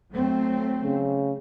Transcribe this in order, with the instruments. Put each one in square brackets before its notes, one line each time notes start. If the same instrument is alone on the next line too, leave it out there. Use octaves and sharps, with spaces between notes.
[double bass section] F#3 A3 C4
[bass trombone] C#3